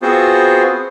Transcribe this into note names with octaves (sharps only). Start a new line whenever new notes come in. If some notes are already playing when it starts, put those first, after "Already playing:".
B3 C4 F4 F#4 G#4 C5